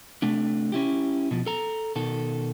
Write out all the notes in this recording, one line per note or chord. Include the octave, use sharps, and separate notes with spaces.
C3 A3 D4
C#4 E4 G4
B2 F3
A4 A#5
B2 D#3 A4